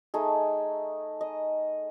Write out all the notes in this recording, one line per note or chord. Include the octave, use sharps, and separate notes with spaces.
A3 D#4 G#4
D#5